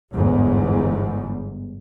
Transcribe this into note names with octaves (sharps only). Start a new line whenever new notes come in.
G1 E2 G#2